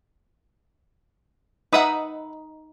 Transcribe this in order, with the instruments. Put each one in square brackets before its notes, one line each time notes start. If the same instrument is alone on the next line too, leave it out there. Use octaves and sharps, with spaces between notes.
[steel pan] D#4 B5 D#6 [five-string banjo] B4 E5 F#5